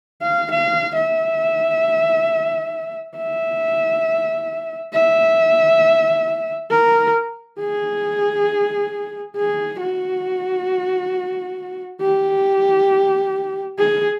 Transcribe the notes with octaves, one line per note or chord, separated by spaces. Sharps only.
F5
F5
E5
E5
E5
A#4
G#4
G#4
F#4
G4
G#4